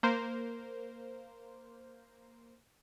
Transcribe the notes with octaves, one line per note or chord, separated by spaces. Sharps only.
A#3 A#4 C5